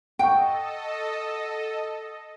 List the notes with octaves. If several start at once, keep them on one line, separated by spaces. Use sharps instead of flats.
A4 D#5 F#5 G5 C#6